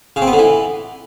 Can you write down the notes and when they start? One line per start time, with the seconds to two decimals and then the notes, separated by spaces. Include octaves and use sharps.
0.16 C#3
0.22 C4
0.27 B3
0.33 D3
0.38 E3